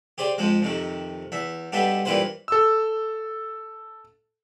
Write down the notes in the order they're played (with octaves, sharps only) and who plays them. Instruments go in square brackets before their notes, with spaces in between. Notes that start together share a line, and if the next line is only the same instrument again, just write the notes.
[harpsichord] G4 G#4 C5 D5
F2 F3 G#3
F2 C3 D#3
E2 E5
G2 B2 B3 G4 A4 E5
G2 A#2 E3 G4 B4 C5
[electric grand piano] A4 E6